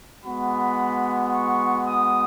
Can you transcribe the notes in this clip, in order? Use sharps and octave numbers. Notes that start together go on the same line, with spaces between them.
G#3 B3 F#4 B5
C#6
D#6